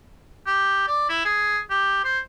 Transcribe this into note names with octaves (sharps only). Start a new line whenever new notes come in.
G4
D5
E4
G#4
G4
C5